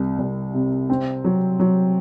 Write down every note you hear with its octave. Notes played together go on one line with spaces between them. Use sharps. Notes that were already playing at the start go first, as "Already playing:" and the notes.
Already playing: C2 C3
C2
C3
C4
F#3
F#3